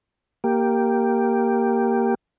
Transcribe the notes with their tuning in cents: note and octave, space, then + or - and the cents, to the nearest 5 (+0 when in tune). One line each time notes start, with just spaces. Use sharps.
A#3 +0 G4 +0